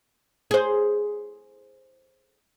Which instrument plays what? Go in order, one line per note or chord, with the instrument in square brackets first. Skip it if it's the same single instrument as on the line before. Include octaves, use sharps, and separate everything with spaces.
[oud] G#4 C5